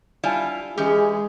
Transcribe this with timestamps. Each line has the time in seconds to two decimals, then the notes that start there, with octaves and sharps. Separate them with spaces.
0.24 G3 E4 F4 D5 G#5 A5
0.78 E3 G#3 C#4 G4 G#4